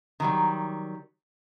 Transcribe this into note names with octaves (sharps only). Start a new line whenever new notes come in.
D#3 F#3 G3